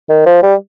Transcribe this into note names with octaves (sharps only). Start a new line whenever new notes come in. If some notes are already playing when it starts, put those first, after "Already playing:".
D#3
F3
G3